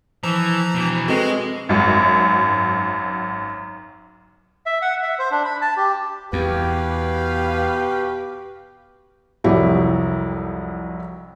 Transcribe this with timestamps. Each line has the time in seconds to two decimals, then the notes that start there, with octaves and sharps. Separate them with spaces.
0.23 E3 F3 A#5
0.74 B2 E3
1.08 G#3 C4 F#4 A4 B4 D#5
1.69 G#1 F#2
4.66 E5
4.82 F#5
5.03 E5
5.19 C5
5.31 D4
5.45 B5
5.61 A5
5.77 G4
6.33 E2 B2 G4 B4 F5
9.44 C2 F2 F#3 E4 G4